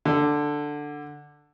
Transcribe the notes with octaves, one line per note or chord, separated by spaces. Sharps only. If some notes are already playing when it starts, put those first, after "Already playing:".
D3